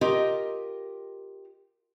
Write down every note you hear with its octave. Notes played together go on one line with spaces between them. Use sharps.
F4 G4 A#4 D#5